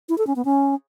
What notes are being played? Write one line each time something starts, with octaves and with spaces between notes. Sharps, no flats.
E4
A4
C#4
B3
C#4